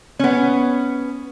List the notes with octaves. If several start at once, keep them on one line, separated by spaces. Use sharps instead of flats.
B3 C#4